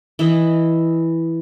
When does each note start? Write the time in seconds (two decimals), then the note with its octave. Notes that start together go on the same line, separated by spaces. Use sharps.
0.19 E3 E4 D#5